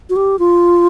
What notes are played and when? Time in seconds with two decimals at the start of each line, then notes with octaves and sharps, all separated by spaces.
0.10 F#4
0.16 G4
0.39 F4